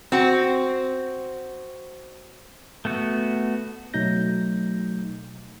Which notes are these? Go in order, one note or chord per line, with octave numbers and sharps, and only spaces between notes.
C4 F#4
A3 B3 F#4
B2 F#3 A3 D#4 G6 A#6